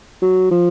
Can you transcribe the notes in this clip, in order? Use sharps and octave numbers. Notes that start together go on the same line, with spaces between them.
F#3
F3